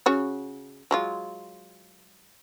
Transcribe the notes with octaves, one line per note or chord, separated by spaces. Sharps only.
C#3 F#4 C#5
F#3 G#3 F4